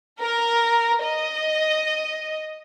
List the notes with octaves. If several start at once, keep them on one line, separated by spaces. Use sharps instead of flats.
A#4
D#5